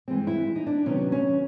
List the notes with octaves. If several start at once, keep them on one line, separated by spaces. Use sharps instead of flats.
G2 E3 G#3 C4
E4
D#4
D4
C3 D#3 F#3 B3 C#4
C#4